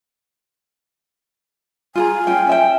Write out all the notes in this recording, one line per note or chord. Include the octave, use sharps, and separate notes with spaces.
F4 G#4 G#5 A#5
C#4 F4 G5
C#4 E5 G5